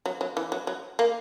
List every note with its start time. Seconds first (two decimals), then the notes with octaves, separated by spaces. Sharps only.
0.06 F#3
0.21 F#3
0.37 E3
0.52 F#3
0.67 F#3
0.99 A#3